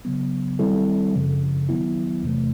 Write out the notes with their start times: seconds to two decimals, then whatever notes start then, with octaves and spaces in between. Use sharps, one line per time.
0.05 C#3 F#3 B3
0.59 D#3 G3 C4 E4 A4
1.14 F#2 C#3 F3
1.69 D#3 F#3 B3 E4
2.23 E2 C3 E3 A3